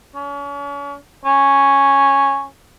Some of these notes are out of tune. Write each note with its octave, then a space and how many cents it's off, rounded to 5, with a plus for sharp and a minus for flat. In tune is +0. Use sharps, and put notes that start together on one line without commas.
C#4 +40
C#4 -5